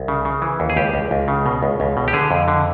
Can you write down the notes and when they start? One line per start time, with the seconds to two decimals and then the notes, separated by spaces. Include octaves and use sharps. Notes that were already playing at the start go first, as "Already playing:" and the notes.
Already playing: C2
0.08 C#3
0.25 C#3
0.42 E3
0.60 D#2
0.70 G#4
0.76 C#2 G4
0.94 C#2
1.11 C#2
1.28 C#3
1.46 B2
1.63 C#2
1.80 C#2
1.97 B2
2.08 G4
2.13 D3 G#4
2.31 F2
2.48 D3